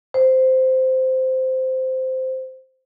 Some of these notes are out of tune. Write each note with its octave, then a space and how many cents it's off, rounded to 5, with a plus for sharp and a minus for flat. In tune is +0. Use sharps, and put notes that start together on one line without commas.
C5 -10